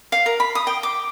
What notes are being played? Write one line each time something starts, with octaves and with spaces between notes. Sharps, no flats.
F5
A#4
B5
D#6
G5
D6